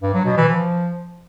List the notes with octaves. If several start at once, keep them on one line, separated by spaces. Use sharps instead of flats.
G2
F#3
B2
E3
F3